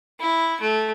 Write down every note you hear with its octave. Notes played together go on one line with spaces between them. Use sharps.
E4
A3